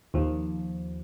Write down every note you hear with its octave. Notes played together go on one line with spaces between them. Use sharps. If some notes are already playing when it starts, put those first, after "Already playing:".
D#2 F3